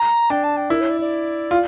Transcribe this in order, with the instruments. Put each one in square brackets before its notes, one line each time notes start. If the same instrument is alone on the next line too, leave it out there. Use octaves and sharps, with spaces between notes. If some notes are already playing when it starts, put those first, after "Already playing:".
Already playing: [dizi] A#5
[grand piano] D4 [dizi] G5
[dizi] A5
G5
[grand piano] E4 [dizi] A#4
[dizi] C#5
D5
D5
[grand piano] F4